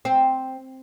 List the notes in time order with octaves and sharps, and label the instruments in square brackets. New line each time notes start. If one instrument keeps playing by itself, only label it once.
[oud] C4